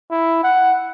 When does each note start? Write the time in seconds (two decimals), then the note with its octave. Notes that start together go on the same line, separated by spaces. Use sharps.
0.10 E4
0.43 F#5